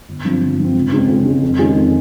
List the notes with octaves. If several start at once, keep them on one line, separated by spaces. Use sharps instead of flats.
G1
G2 F3 C4
G1
G2 F3 C4
C#2
C#3 G#3 C4
C#2
C#3 G#3 C4
F2
D#3 G#3 C#4 G#4
F2